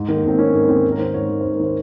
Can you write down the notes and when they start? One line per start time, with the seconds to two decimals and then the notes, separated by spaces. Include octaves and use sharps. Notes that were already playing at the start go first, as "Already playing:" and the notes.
Already playing: G#2
0.08 D#3
0.16 A#3
0.24 G#2 C4
0.38 D#3 C#4
0.54 G#2 A#3
0.69 D#3 C4
0.84 G#2
0.92 A#4
0.99 D#3 C5
1.14 G#2 C#5
1.29 D#3
1.41 C5
1.45 G#2
1.52 A#4
1.59 D#3 C5